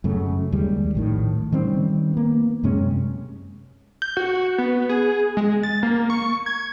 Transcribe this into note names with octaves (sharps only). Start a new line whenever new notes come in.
F#2 C#3 A3
D#2 G3 G#3
A#1 A2 D#3
D#3 G3 C4 C#4
A#3 B3
F#2 C3 G#3 C#4
G6
F#4
B3
G#4
G#3
A6
A#3
C#6
G#6